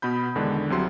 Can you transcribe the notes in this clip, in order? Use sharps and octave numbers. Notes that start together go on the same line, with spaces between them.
B2 B3 B5 G6
E2 D3 D#3 G#3 D4
C2 C3 F#3 C6